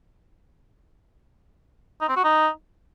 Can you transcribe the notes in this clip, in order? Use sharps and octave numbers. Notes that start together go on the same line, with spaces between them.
D#4
C4
F#4
D#4